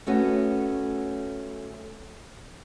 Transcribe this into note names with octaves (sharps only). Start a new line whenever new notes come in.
A3 B3 C#4 F#4